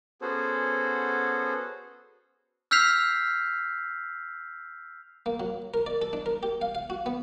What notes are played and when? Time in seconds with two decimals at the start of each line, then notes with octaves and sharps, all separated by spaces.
0.21 B3 C#4 F#4 G#4 A4 C5
2.71 E6 F6 G6 B6 C7 F7
5.26 A#3
5.40 F#3
5.74 A#4
5.86 D5
6.02 A4
6.13 D4
6.26 A#4
6.43 G4
6.62 F5
6.75 F5
6.90 F#4
7.06 B3